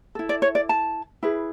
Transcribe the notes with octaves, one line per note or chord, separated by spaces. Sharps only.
E4 A4
D5
C#5
D5
A5
E4 G#4 B4